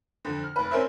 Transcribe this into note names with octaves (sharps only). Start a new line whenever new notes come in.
F2 D3
F6
F1 B4
C4 C#4 A#4 C5 E5